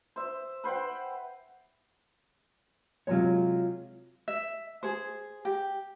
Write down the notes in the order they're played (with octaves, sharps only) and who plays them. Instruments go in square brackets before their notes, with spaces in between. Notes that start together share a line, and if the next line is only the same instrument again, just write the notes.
[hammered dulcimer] C5 E5
B4 C5 F#5 G5
[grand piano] C3 F#3 G#3 [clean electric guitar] F4 C#5
[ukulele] E5
G#4 C5
G4